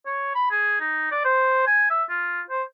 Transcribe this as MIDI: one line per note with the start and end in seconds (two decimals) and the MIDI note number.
0.07 0.34 73
0.35 0.50 83
0.51 0.80 68
0.81 1.11 63
1.12 1.23 74
1.25 1.67 72
1.67 1.88 80
1.90 2.04 76
2.10 2.41 65
2.51 2.63 72